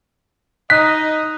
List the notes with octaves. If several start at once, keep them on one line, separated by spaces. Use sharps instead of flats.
D#4 D#5 F#6 B6